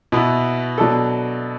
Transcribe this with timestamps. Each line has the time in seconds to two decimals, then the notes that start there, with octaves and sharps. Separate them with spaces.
0.12 B2 B3 E4
0.78 B2 F#3 D4 A4